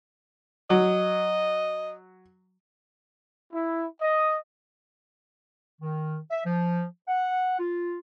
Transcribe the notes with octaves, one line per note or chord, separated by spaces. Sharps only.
F#3 D#5
E4
D#5
D#3
E5
F3
F#5
F4